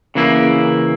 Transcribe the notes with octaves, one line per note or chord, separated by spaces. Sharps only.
C#3 E3 A#3 E4